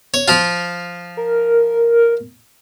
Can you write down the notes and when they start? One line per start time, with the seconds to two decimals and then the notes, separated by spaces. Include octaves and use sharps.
0.14 C#5
0.28 F3 F4
1.17 A#4